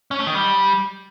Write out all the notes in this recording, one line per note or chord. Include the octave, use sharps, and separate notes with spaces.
C#4
A3
D#3
G3